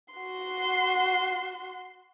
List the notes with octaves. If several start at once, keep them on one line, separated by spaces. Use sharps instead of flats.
F#4 C6